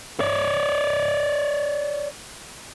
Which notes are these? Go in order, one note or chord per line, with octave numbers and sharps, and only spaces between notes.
C#5 D5